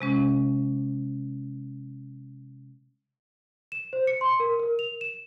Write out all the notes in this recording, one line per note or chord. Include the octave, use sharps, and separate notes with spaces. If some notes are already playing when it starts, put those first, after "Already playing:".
C3 G#3 C#4
E7
C5
C#7
C6
A#4
A#4
F7
E7